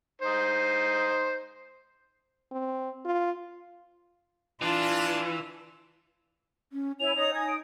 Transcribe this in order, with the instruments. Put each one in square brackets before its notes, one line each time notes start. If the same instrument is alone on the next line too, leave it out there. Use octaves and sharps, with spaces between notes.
[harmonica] D#4 C5
[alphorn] C4
F4
[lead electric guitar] E3 [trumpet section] D4 [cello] F4
[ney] C#4
[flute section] E4 G#5 [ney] C#5 [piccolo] F7
[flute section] D#4 D#6 [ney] C#5
[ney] G#5 [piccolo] G#6
[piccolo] D7